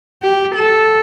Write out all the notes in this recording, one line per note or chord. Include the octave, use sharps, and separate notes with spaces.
G4
A4